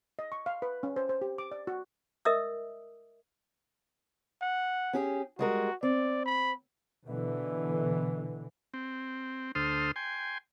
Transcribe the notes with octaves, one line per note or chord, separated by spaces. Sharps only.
D#5
C#6
F5
B4
C#4
C5
C5
G4
D6
D5
F#4
A#4 D#5 E5 D#6 E6
F#5
C#4 G4 G#4
G3 G#3 F#4 A#4
C4 D5
B5
B2 D3 E3
C4
D2 A4 C5 C6 D#6 F6
G5 G#5 C6